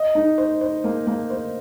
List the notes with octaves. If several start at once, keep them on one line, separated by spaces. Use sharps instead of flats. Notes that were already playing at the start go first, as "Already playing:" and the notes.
Already playing: D#5
D#4
C5
C5
A#3
A#3
C5